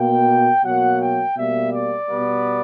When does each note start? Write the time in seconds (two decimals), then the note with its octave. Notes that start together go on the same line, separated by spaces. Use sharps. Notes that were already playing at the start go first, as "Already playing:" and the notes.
Already playing: B2 A#3 G5
0.63 B2 F#3 A#3 F#5
1.00 G5
1.36 B2 G3 A#3 E5
1.72 D5
2.09 B2 G3 B3